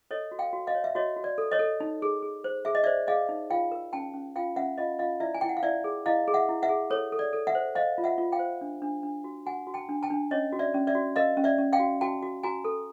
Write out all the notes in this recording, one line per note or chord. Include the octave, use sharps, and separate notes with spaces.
A4 C#5 D#5
F#4
F5 G5
F#4
D#5 F5
C#5
E5
F#4 C#5 D#5
F#4
D5
A4
C#5 D#5
A4
D#4
G#4
G#4
C5
G#4 E5
D#5
C5 D5 E5
G#4 D#5 F5
D#4
F4 F5 G5
A#4
C#4 G5 A5
C#4
F4 F5 G5
C#4 E5 F#5
F4 D#5 F5
F4 D#5 F5
E4 D5 E5
G#5
E4 G5
F#5
F5
E4 D5 E5
G#4
E4 D#5 F5
G#4
E5 F#5
E4
E5 F#5
G#4
A4 C#5
A4
D5
A4
E5 F#5
C5
C5 D#5 F5
F4
E5 F#5
F4
F5 G5
C5
D4
D4
D4
F#4
F#4 F#5 G#5
F#4
G5 A5
D4
G5 A5
D4
C#4 C#5 D#5
F#4
D5 E5
C#4
D5 E5
F#4
A#4 D#5 F5
C#4
D5 E5
C#4
F5 G5
F#4
F#4 G5 A5
F#4
F#4 G#5 A#5
A4